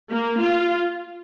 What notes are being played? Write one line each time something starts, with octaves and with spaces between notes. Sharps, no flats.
A#3
F4